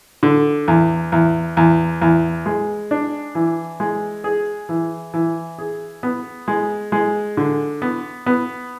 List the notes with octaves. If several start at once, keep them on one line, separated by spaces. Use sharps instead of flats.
D3
E2
E2
E2
E2
G#3
D4
E3
G#3
G#4
E3
E3
G#4
B3
G#3
G#3
D3
B3
B3